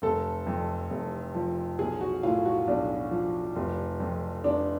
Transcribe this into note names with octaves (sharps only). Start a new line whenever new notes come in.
F1 A4
F2
F1
F3
B1 G#4
F#4
A2 F4
F#4
B1 D4
F3
F1
F2
F1 D4